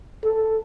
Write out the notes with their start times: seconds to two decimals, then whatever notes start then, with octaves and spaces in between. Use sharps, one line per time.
0.25 A4